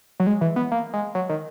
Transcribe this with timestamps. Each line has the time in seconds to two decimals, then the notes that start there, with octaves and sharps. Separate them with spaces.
0.20 F#3
0.27 G#3
0.41 E3
0.56 B3
0.72 A#3
0.93 G#3
1.15 F#3
1.29 D#3